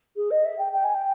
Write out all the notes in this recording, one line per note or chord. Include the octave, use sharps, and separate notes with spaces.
G#4
D#5
E5
G5
G5
G#5
G5